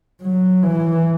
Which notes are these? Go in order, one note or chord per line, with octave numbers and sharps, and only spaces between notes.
F#3
E3